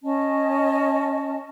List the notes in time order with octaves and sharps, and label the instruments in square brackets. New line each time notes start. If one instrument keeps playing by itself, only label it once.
[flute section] C#4 D#5 A5